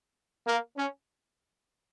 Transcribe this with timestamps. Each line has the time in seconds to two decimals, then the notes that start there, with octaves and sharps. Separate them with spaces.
0.46 A#3
0.77 C#4